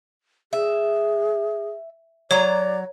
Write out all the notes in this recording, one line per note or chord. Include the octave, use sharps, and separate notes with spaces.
G#4 E5
F#3 C#5 D5 A#5